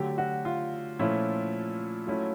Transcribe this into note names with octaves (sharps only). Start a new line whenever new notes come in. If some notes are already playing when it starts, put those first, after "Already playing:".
Already playing: D3 F#3 A3 G4
F#4
F4
A#2 F3 A3 C#4 E4
F#3 A3 C#4 E4